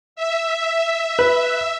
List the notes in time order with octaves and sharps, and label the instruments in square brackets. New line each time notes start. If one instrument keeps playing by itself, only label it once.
[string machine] E5
[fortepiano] B4